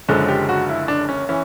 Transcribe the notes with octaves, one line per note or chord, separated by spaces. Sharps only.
F#1 F#2 D3 F3 G#3
G4
F#4
E4
D4
C#4
E3 C#4